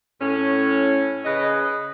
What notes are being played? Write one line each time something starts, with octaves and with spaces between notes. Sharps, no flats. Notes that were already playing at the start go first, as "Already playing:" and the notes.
A2 C#4
C#3 B4 D#5